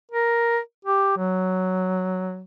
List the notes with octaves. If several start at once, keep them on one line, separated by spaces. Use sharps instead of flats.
A#4
G4
F#3